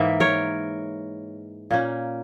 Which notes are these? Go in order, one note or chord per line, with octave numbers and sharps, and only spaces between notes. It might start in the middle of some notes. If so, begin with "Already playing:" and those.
Already playing: G#2 E3 A#3 E5
A#4 C#5
A#2 A#3 C#4